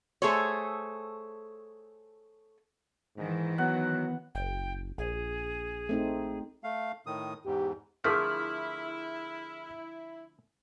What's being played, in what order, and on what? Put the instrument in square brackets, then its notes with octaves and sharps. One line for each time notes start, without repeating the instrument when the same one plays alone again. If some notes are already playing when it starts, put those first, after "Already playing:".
[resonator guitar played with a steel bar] A3 G#4 A4 C5 C#5
[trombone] G#2 [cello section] D#3 E3
[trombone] F#3 [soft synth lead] B3 [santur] F#5
[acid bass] F#1 [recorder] G5
[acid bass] A#1 [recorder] G#4
[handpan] A3 C4 D#4
[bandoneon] A3 F5
A2 D#3 D#6
[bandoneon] E2 G#2 [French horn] G4
[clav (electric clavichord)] D3 F3 A3 [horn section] E4 [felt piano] G#4 A#4 B6 [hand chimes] F6